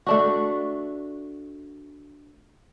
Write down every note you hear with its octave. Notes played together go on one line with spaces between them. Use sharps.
A3 D4 F#4